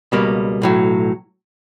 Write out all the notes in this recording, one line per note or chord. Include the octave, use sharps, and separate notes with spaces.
C#2 B2 G3 A#3
B1 A2 F#3